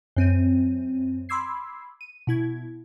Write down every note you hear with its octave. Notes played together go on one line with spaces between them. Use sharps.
F#2 C4 D#7
B5 C6 D6 E6 G#6 C7
D#7
B2 E4 G#6